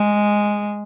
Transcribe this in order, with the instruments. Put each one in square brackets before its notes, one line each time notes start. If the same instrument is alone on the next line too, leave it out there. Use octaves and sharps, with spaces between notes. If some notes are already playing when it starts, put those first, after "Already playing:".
Already playing: [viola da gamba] G#3